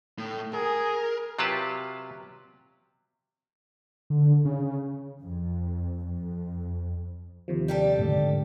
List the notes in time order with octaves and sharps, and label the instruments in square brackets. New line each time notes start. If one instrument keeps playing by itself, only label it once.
[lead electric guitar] A2
[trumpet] G#4 [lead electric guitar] A#4
[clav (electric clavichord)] C3 F#3 F4 G4 B4 A5
[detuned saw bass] D3
C#3
[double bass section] F2
F2
[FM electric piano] D#2 C3 F3
[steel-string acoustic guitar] G3 G4 A4
[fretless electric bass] G#2 D3 A3